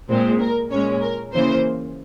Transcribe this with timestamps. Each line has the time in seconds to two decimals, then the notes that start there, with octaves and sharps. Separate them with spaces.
0.09 A#2 G#3 C4
0.41 A#4
0.71 A#2 G#3 C#4 C#5
1.02 A#4
1.33 C#3 E3 A#3 C5